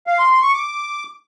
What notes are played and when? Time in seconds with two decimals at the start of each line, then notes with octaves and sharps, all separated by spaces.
0.07 F5
0.19 C6
0.30 C6
0.42 C#6
0.54 D6